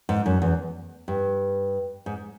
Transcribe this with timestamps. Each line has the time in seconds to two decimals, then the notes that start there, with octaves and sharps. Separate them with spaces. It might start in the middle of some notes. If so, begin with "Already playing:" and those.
0.09 G#2
0.26 F#2
0.42 E2
1.08 G2
2.06 G#2